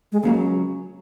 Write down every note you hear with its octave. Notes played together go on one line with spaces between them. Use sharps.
G#3
C#2 C#3 F#3 A#3